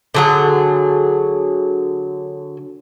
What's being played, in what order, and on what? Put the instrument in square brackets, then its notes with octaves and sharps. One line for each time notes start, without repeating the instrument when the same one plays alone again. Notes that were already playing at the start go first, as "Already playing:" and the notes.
[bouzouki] D3 F#3 G#4